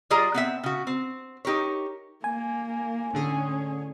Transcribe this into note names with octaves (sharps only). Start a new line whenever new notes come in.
G3 F4 G#4 D5 D#5 A#5
B3 C4 E5
C#3 F#4
C4
D#4 G4 A#4 C#5
A#3 G#5
A2 D3 C#4 G#4